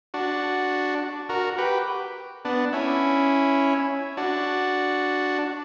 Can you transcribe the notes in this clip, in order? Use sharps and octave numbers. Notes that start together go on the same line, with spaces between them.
D4 F#4
F#4 A#4
G4 B4
B3 D4
C#4 E4
D4 F#4